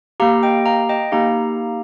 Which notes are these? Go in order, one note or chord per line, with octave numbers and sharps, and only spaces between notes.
A#3 G4 F5 A#5
D#5 G5
F5 A#5
D#5 G5
A#3 D#4 G4 F5 A#5